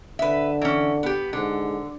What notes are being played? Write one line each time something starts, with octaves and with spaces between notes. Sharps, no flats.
D3 B4 E5
E3 C#4
B3 G4
G#2 D3